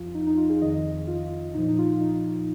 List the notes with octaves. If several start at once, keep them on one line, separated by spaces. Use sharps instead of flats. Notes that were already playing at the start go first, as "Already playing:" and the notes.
Already playing: F2 F3 F4
D#4
D#4
F4
G#4
F2 D#3 D#5
F4
A#2 F3 D#4
D#4
F4
F4
D#4